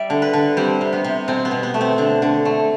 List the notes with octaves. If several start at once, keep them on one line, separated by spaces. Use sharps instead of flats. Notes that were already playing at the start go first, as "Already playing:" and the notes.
Already playing: G3 D5 E5
D3
B4
D3
G3 C4
C3
B3
C3
B2 C4
B3
B2
B3
A3
C4
D3
D3
A3